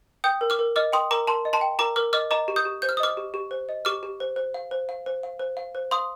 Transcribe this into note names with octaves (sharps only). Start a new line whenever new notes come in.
G5 D#6 G6
A#4
D6 F6
A#4
D#5 D6 F6
G5 C6 D#6
A#4 A#5 D6
A#4 A5 C6
D#5
A5 C6
G5
A#4 A#5 D6
A#4 D6 F6
D#5 D6 F6
D#5 A#5 D6
G4
D#6 G6
G4
C5 G6
F6
D#6
D#5 D6 F6
G4
G4
C5
D#5
G4 D6 F6
G4
C5
C5
F5
C5
F5
C5
F5
C5
F5
C5
F5 C6 D#6